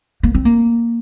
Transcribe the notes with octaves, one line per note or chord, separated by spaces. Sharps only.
A#3
C4
A#3